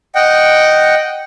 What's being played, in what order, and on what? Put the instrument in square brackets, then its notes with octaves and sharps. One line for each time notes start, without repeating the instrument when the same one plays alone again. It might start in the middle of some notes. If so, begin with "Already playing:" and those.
[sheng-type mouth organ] D#5 F#5 G5